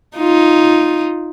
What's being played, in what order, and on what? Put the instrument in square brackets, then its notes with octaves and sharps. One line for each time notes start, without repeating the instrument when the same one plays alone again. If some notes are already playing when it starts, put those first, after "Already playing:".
[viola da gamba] D#4 F4